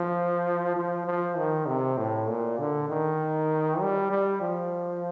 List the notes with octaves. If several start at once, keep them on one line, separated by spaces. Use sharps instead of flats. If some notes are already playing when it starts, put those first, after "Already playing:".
Already playing: F3
F3
F3
D#3
C3
A2
A#2
D3
D#3
G3
G3
F3